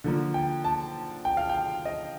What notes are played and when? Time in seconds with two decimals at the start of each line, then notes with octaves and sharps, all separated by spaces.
0.04 D3 F3 A#3
0.34 G5
0.64 A5
1.25 G5
1.37 F5
1.49 G5
1.85 D#5